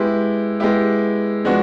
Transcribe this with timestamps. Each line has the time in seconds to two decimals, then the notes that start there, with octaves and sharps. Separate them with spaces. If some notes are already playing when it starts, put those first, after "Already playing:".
Already playing: G#3 B3 E4 G4
0.60 G#3 B3 E4 G4
1.45 F3 G#3 B3 D4 F#4